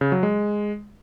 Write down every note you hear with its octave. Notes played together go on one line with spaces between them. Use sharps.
C#3
F#3
G#3